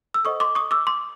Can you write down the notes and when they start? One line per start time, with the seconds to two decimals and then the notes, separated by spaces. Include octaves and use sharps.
0.14 E6
0.24 A4 C5 D#5 F#5 C#6 D#6
0.40 C6 D6
0.55 C#6 D#6
0.71 D6 E6
0.87 C6 D6